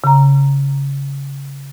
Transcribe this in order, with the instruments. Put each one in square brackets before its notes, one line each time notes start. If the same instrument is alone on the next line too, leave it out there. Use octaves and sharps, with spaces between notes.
[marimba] C#3 A#5